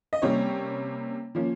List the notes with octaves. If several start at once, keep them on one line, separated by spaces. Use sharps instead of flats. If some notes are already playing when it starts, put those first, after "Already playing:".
D#5
C3 G3 A#3 C#4 C#5
F3 A#3 C#4